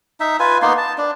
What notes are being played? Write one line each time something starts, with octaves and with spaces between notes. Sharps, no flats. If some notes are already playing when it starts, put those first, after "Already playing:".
D#4 E5
F4 B4 G#5
A#3 B3 D#4 C6
A5
D4